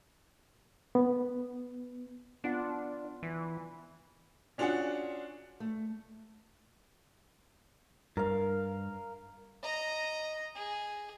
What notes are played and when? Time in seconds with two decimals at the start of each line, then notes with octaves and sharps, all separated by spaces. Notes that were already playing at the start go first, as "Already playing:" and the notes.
0.95 B3
2.44 B3 D4 F4 F#5
3.23 E3
4.58 C#4 D4 F4 F#4 G#4 F#5
5.60 A3
8.17 G2 A#4 F5
9.63 D#5 A#5
10.55 G#4